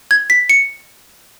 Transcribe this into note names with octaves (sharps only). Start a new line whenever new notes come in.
G#6
B6
C#7